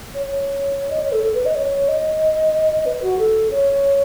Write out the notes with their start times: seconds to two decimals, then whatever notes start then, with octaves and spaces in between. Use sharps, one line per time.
0.15 C#5
0.26 C#5
0.90 D#5
1.01 C#5
1.12 A4
1.23 A4
1.34 B4
1.45 D#5
1.56 C#5
1.88 D#5
2.86 B4
3.02 F#4
3.19 A4
3.51 C#5